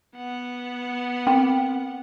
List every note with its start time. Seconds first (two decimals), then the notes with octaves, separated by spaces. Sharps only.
0.16 B3 F#5
1.27 C4 G5 C6 D6